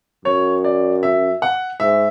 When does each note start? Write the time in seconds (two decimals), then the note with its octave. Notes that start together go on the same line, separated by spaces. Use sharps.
0.25 F#2 C#5
0.64 D5
1.03 E5
1.42 F#5
1.80 G#2 E5